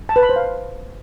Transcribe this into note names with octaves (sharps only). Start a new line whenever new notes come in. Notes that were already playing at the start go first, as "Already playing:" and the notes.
A5
B4
B5
C5
F5